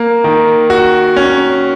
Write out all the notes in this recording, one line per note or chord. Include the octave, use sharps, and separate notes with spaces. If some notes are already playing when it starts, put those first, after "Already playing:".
Already playing: A#3
D#3
F#4
C#4